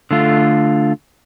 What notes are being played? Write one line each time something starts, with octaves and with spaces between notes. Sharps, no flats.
D3 A3 F4